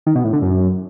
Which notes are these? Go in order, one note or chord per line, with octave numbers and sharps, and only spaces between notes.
D#3
B2
A2
D3
F#2